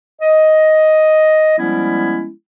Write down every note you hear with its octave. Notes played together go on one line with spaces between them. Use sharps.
D#5
F3 G3 G#3 B3 C#4 E4